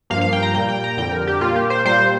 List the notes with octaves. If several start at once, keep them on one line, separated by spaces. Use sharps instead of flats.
G2 F3 A#3 F5
F5
G5
A#5
A#2 G3 A#3 G5
G5
A#5
F2 D3 G3 G5
A#4
G4
A#2 A#3 F4
G4
C5
A#2 G3 A#3 C5